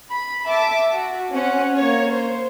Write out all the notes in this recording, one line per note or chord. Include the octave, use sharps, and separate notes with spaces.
B5
E5 A5 D6
F#4
C4 C#4 F#5
A#3 C#5
C5